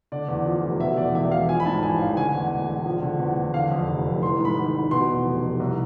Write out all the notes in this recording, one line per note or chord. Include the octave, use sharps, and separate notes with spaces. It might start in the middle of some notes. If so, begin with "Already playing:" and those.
D3 D5
E2
F3
F1
B2 E5
E2 D5
E1 E5
E1 F5
F3 G#5
B5
G#2 A5
A1 G#5
A1 F5
D3 G#5
E2
E1
E1
F3
D3
E2
E2
D3 F5
F2
F1
F1
E3 C6
G#2
B5
G#1
G#1
B2 C6
E2
F1
F1
C2